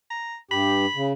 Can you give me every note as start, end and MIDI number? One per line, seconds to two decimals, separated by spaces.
0.10 0.37 82
0.51 0.86 43
0.51 0.86 67
0.51 1.11 83
0.95 1.13 49